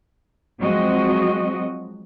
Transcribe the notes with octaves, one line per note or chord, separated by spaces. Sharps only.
F3 F#3 G#3 C4 F#4 D#5